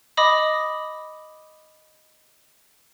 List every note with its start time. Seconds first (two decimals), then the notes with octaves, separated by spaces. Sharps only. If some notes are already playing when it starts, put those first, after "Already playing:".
0.17 D#5 B5 D6 D#6